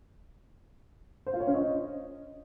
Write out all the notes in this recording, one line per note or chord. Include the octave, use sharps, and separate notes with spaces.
C5
F4
C#5
C#4
D#5